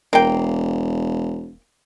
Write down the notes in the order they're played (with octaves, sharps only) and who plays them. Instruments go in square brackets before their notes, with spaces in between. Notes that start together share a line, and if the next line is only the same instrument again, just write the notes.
[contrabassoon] E1 [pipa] A#3 G5